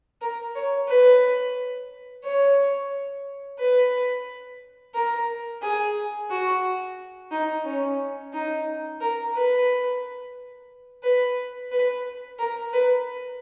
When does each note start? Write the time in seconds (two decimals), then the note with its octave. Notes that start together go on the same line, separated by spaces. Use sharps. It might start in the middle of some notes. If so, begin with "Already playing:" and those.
0.21 A#4
0.55 C#5
0.88 B4
2.24 C#5
3.59 B4
4.95 A#4
5.62 G#4
6.30 F#4
7.31 D#4
7.65 C#4
8.33 D#4
9.01 A#4
9.35 B4
11.03 B4
11.71 B4
12.39 A#4
12.73 B4